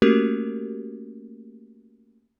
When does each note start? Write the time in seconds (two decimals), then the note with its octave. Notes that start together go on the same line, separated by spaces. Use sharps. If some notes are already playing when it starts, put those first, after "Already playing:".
0.02 A3 A#3 C#4 F#4 G4 A#4